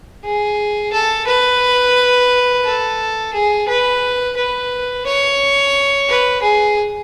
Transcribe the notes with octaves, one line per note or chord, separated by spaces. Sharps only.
G#4
A4
B4
A4
G#4
B4
B4
C#5
B4
G#4